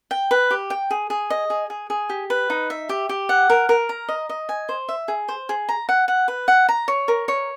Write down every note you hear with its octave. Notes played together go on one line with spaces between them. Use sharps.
G5
B4
G4
G5
G#4
G#4
D#5
G#4
G#4
G#4
G4
B4
D#4
E5
G4
G4
F#5
A#4
A#4
A#5
D#5
D#5
G#5
C5
E5
G#4
C5
G#4
A#5
F#5
F#5
B4
F#5
A#5
C#5
A#4
C#5